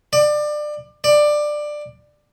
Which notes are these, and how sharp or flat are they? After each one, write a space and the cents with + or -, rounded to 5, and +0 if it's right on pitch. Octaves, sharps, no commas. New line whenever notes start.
D5 +25
D5 +15